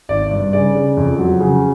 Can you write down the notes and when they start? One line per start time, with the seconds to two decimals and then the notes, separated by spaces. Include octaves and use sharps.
0.09 G#1 D5
0.31 G2
0.53 C#3 D5
0.75 C#3
0.97 F2
1.18 F#3
1.40 C#3